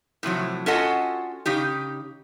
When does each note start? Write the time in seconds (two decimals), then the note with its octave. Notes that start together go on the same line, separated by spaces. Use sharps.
0.23 A2 C3 F3 F#3
0.66 C#4 F4 F#4 A4 D#5 F#5
1.46 C#3 D#4 G4